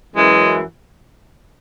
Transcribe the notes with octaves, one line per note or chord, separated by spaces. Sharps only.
F#2 E3 G#3